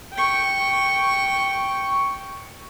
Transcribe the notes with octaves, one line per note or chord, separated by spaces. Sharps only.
G5 C#6